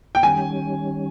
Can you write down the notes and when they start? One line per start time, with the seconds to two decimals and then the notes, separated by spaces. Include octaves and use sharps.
0.15 G5
0.23 D#3 G3 C#4 G#5